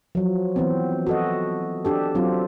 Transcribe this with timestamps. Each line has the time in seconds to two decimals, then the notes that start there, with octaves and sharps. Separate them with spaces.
0.15 F3 F#3
0.56 E3 B3 C4
1.07 F#4 A4 D#5
1.85 D4 G4 A4
2.15 F#3 C4 F4